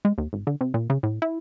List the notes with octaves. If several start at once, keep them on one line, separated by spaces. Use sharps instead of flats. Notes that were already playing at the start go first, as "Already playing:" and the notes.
G#3
D#2
G#1
D3
C3
A#2
C#3
A2
E4